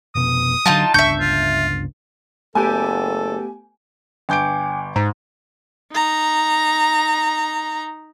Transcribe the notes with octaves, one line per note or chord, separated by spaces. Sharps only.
F1 B2 D#6
D3 F#3 D#4 F4 A5
G1 C#2 D4 E5 C#6 G6
F4
F#1 A3 B3 G4 A4 G#5
G1 G5 G#5 D6 G6 D7
G#2 A#5
D#4 A#5